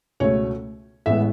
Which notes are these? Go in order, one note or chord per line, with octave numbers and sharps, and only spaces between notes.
C#2 B2 A3 C#5
A1 A2 G#3 B3 E5